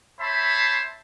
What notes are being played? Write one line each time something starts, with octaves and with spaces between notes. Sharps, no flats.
C5 C#5 E5 A5 B5 C6